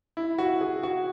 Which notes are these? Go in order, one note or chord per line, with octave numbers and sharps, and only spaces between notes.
E4
F#4
G#4
F#4